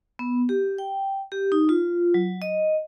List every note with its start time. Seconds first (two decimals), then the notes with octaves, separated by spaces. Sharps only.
0.19 B3
0.49 G4
0.78 G5
1.32 G4
1.52 D#4
1.69 F4
2.14 F#3
2.42 D#5